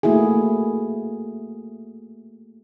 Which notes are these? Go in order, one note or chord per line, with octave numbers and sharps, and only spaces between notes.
A3 A#3 E4 F#4 G#4